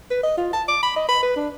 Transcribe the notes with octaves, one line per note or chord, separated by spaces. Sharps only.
B4
D#5
F4
A5
D6
B5
D#5
B5
B4
D4